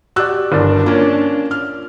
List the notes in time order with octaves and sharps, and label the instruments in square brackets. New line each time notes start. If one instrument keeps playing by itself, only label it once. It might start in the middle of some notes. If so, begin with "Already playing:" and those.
[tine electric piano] F#4 G4 D5 [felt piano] E6 F#6
[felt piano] G1 [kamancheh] D4 [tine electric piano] E4 A#4 D5
[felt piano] A#3 C#4 [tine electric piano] F4
[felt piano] F6